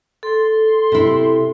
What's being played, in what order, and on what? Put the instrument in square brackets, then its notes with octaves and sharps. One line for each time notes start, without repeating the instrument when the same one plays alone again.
[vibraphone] A4 [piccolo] C6
[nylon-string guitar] C3 E4